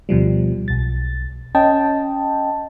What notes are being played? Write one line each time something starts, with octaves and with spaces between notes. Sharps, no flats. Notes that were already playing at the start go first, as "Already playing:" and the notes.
D2 B2 F3 G3
B1 A6
C#4 D#5 G5 A5